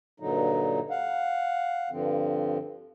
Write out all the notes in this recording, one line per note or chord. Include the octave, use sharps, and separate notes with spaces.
G2 A#2 D3 F#3 D#4
F5 F#5
G2 D3 F3 C4